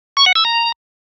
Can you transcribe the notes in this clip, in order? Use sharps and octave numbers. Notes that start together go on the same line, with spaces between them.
C#6
F#5
E6
A#5